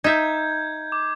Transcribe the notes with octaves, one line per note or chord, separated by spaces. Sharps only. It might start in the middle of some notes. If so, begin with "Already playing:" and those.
D#4 E5 G6 G#6
D6